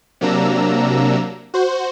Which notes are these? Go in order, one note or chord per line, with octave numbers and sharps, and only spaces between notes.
C3 F#3 A#3 D4 A#5 E6
F#4 C5